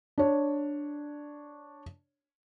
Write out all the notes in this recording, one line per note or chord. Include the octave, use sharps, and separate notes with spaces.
D4 C#5